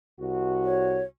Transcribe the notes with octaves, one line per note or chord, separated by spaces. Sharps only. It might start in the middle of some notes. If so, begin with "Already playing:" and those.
C2 F#4
C#5